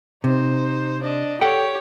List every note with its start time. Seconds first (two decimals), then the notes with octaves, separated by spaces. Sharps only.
0.24 C3 D#4 C5
1.02 D4 D#5
1.41 G4 A4 C#5 F#5 G5